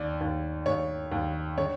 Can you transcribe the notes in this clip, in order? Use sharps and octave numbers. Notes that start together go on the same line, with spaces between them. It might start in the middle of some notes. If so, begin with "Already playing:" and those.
Already playing: D#2 D5
D#2
D#2 C#5
D#2
D3 C#5